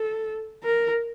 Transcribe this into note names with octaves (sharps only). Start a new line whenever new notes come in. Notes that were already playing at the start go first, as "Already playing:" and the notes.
Already playing: A4
A#4